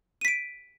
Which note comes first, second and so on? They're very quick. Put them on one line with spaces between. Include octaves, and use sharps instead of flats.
D#7 B6 D7